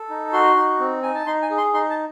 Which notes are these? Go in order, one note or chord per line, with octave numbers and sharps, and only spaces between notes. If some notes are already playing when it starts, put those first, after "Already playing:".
Already playing: A4
D#4
F#4 C6
D#4
C4
D#4 G#5
A5
D#4 C6
G#5
G#4
C6
D#4 C6
A5